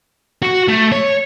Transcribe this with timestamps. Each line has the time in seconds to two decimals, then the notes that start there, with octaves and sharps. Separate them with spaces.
0.42 F#4
0.68 A3
0.92 C#5